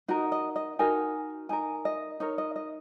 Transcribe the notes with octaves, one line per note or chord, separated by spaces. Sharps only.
D#4 F#4 A#4 D#5
D#5
D#5
D#4 F#4 A#4 G#5
D#4 A#4 G#5
D#5
D#4 A#4 C#5
D#5
D#5